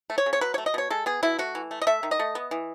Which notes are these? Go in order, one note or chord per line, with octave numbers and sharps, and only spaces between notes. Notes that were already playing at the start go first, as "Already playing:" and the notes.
A3
C#5
C#3
C#5
F#3 B4
C#5
A3
D#5
B2 C#5
G#3 A4
B3 G#4
B2 E4
A3 F#4
E3
A3
D#5
A3 E5
D#3
D#5
A3
B3
E3